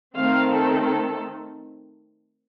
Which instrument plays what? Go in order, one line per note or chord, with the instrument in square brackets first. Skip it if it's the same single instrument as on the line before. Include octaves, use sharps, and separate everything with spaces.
[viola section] D#3 A3 C4 F5
A4
A4